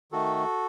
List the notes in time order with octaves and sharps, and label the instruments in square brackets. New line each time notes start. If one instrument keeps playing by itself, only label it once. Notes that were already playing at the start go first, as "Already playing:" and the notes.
[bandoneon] D#3 A3 F#4 A4